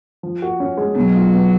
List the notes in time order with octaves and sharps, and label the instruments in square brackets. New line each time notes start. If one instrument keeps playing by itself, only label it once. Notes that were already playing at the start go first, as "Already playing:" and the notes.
[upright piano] F3
F#4
C#4
G#3
[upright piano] B2 [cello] F#3
[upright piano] F4
B3